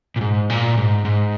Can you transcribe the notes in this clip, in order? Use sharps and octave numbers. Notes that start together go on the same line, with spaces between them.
A#2
G#2
A#2
G#2
G#2